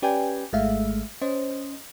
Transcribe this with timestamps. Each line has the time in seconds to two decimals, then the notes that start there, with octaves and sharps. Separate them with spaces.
0.02 C#4 G4 B4 D5 G5 G#5
0.53 G#1 G#3 A3 E5 F5
1.22 C#4 C5 D#5